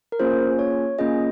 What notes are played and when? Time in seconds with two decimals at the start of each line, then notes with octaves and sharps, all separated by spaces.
0.12 A#4
0.19 A#3 C#4 F4 G#4 C5
0.59 C#5
0.99 A#3 C#4 F4 G#4 D#5